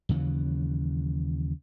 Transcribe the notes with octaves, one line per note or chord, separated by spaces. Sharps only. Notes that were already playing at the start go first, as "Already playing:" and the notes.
D#2 C#3 E3 F#3